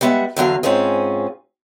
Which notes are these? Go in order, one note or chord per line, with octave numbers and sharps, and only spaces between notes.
G3 G#3 B3 E5 F#5
E2 D3 F#3 F5
G#2 C4 C#4 F4 G#4